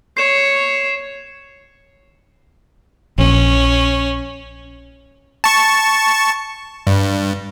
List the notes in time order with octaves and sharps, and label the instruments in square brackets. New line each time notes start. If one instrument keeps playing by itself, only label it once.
[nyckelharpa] C#5 [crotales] C7 E7
[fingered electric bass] A#1 [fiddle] C#4
[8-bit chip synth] A5 C#6
G2